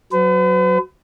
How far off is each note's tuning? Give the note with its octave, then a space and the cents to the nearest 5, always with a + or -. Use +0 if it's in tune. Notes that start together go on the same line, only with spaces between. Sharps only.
F#3 +0 B4 +45